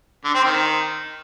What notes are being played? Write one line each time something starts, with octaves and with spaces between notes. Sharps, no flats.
D3
C4
D#3